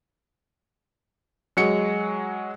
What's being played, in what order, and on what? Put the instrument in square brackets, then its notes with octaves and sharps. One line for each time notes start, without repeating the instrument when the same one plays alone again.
[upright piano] F#3 G#3 C#7